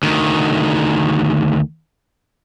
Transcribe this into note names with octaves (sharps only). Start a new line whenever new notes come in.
D2 D#3